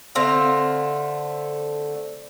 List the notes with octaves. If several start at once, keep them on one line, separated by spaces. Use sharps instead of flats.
D3 A3 C4 F5